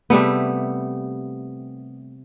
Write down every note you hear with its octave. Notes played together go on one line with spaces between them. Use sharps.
C3 G3 A3 B3